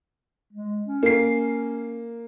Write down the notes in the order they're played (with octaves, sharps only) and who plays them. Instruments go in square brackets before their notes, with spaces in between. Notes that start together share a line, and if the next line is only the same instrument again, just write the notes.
[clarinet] G#3
C#4
[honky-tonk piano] A#3 C7